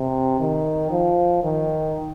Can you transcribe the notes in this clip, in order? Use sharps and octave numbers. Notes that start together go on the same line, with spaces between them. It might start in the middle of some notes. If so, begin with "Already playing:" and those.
Already playing: C3
D#3
F3
D#3